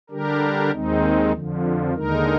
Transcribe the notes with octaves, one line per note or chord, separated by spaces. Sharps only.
D3 G3 D4 G4 A#4
D#2 D#3 G#3 C4 D#4
F2 D3 F3
D#2 D3 G#3 D#4 A#4